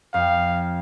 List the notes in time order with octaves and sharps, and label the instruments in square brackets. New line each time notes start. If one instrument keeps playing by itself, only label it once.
[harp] F2 [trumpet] F5